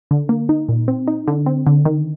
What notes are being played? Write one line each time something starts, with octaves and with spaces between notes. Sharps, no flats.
D3
A#3
D#4
A#2
C4
D#4
D3
C4
D3
D#3